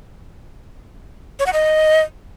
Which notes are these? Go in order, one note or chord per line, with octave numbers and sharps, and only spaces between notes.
C#5
F#5
D#5